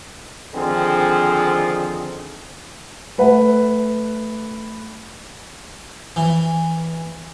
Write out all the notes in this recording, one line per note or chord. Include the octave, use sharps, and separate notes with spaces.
D3 D#3 F3 C4 G#4
A3 B4 F#5
E3